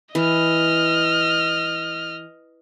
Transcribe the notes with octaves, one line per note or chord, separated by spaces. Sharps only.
E3 D#5 F6